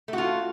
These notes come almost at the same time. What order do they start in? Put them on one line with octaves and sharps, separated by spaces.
A3 F#4 F4